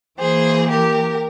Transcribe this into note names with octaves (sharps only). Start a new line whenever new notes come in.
E3 A#3 G#4 C5
G4 A#4